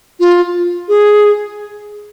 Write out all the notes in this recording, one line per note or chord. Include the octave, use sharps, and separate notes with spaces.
F4
G#4